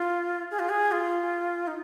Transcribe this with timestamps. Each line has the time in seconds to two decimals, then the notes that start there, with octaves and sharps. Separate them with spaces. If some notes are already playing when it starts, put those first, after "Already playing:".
Already playing: F4
0.51 G#4
0.59 F4
0.69 G#4
0.92 F4
1.67 D#4